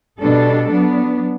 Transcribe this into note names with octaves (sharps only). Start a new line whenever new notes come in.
B2 G3 D4 A4
F#3 B3 D4